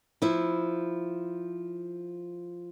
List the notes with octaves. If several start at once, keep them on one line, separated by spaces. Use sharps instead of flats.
F3 E4